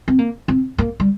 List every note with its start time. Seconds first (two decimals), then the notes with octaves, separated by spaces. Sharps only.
0.08 C4
0.19 A#3
0.48 C4
0.78 A#3
1.00 G3